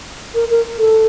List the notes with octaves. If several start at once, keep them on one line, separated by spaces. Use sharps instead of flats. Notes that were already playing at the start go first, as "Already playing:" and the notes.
A#4
A#4
A4